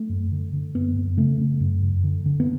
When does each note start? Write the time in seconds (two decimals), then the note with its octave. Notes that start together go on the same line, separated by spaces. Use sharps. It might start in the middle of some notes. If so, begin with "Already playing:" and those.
Already playing: A3
0.09 F#2
0.32 D3
0.53 D3
0.74 F#2 B3
0.96 F#2
1.17 C#3 A3
1.39 C#3
1.60 F#2
1.82 F#2
2.04 D3
2.26 D3
2.40 B3